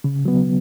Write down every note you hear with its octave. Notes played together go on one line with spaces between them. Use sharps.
C#3
F#3 B3